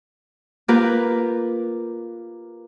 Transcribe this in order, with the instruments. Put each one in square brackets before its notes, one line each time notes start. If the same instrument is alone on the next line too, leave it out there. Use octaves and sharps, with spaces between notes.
[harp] A#3 F4 G4 A#4 B4